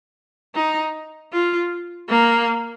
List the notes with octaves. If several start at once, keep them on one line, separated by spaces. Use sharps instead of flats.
D#4
F4
A#3